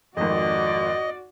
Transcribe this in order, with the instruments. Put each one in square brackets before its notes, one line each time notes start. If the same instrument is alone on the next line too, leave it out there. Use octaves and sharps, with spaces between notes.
[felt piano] G#1 F2 [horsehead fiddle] F#4 D5 [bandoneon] D#5